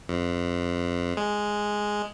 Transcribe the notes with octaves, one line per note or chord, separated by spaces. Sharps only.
F2
G#3